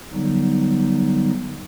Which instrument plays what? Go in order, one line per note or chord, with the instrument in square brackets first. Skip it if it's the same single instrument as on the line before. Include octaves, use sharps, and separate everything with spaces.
[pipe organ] D3 F#3 G3 B3 D#4